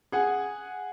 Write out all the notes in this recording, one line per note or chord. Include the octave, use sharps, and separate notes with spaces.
G#4 F#5 G#5